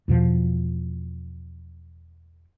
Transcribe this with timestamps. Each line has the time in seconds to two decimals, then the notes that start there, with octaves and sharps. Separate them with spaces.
0.08 E2 B2 F3